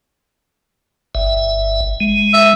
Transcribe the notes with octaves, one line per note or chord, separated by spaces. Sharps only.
G1 E5
G#3
E5